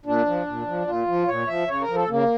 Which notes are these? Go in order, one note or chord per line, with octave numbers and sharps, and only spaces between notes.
A#2 D4
F3
A#2
F3
A#2 F4
F3
A#2 C#5
F3 E5
C#3 C#5
A#4
F3
A4
C#3 A#3